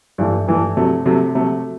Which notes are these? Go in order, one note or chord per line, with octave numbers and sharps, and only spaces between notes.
G2 E3 A3
G2 E3 A3
C3 F#3 A3
C3 F#3 A3
C3 F#3 A3